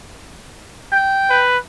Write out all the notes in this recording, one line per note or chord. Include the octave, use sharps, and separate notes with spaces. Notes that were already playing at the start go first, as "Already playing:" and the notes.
G5
B4